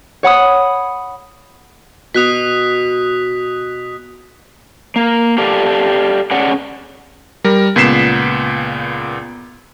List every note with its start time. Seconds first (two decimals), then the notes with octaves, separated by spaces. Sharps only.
0.23 C#5 F#5 B5 D#6
2.14 B2 C#6 D#6 F#6 B6
4.96 A#3
5.38 G4 A4 D5 F5
6.31 C#4 G#4 D5 F#5
7.44 G3 A#4
7.76 C#2 A#2 B3 B6 C7 E7